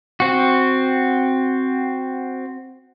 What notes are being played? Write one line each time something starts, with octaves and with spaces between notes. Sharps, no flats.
C4 F#4